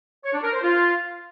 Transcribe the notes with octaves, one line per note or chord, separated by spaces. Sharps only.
C#5
D4
A#4
C5
F4